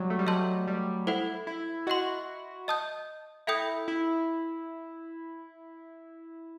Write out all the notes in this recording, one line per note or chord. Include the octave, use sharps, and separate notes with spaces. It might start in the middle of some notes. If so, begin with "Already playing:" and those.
Already playing: F#3 G3
A3
G3
F#3 D#5 A5 C6 E6 G6
G3
E4 A4 C5 F#5
E4
F#4 D#5 F#5 C6
D#5 A5 D#6 G6
E4 A4 E5 G5 D#6 G6
E4